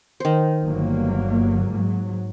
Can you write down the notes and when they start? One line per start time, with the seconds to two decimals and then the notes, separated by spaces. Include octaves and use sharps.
0.20 D#3 C5
0.63 G1 F#3 A#3
1.68 G#2 F#3